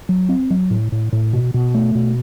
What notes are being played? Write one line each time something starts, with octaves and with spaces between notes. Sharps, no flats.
F#3
C4
F#3
A2
A2
A2
B2
B2
A3
B2